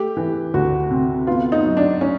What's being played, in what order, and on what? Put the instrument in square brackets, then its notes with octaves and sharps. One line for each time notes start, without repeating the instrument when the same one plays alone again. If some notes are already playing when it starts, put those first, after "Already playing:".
Already playing: [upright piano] A3 G4
E3
D2 F#4
C3
B3 F4
D#4
F#3
D4
C#4